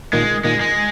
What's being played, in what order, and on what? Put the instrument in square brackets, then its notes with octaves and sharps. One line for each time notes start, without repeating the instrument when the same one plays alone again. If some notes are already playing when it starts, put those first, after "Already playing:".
[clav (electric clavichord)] A#2 D#3 [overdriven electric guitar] G#3
[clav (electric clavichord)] A#2 D#3 [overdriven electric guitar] G#3
[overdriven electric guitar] G#3